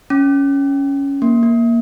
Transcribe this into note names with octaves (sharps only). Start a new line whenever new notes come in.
C#4
A#3
A#3